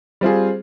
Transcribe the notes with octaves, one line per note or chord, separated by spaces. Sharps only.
G3 C4 F4 G#4